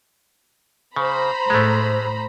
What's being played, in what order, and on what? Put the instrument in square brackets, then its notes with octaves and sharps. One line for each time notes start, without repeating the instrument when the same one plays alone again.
[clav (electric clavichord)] C#3 [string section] C5 A#5 B5
[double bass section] A2 [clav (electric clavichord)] G#3 A3